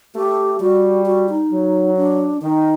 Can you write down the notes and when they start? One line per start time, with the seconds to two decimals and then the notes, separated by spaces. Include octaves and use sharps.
0.16 A3 G4
0.61 G3 F#4
1.06 F#4
1.29 D#4
1.52 F#3
1.97 D4
2.42 D#3 D#4